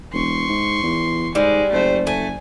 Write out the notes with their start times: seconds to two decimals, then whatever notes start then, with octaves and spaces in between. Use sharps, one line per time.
0.13 E1 C6 C#6
0.49 G#2
0.83 E2
1.35 G#2 G3 G#3
1.72 F#1 A3 C5
2.07 A3 G#5